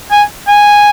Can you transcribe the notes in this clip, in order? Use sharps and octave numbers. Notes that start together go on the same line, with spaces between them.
G#5
G#5